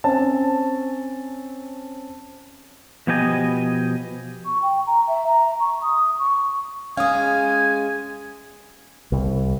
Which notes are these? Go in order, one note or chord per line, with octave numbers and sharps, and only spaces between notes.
C4 C#4 A5
B2 F3 B3 G4 D#5 G#5
C#6
G5
A#5
E5
A#5
C#6
D#6
C#6
G#3 C#4 F5 G#5 D#6
C2